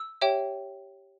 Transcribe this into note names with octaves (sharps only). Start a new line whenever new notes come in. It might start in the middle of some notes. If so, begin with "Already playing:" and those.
Already playing: E6
G4 C#5 E5 G5